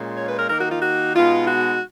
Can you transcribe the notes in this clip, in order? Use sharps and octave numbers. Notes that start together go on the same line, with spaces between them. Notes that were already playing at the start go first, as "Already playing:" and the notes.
Already playing: A#2 G#3 C#4 F4
C#5
B4
A#4
D#3 A#3 D#4 A#4
F#4
F4
F#4
B2 G#3 B3 D#4 F4
F#4